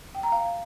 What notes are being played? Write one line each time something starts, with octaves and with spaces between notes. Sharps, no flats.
G5
A#5
F5